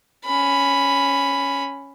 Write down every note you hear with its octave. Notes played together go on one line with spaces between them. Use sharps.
C#4 B5